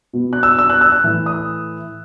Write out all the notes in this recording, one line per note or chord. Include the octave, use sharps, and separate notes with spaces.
B2
F#6
E6
E6
F#6
E6
F#6
A2 E3
D#6